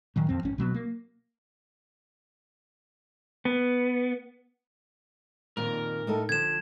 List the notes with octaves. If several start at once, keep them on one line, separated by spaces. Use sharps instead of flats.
A#2 D#3 F#3
F2 F3 C4
G#1 C#4
B2 F#3 A3 B3
A#3
B3
F2 A#2 D#3 A#4
A2 D#4 A4
D3 F3 G#6 E7